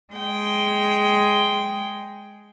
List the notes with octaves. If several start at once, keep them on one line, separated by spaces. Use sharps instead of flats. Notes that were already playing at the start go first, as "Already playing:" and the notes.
G#3 G5